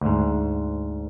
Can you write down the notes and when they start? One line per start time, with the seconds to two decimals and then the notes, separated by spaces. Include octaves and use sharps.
0.01 D2 G#2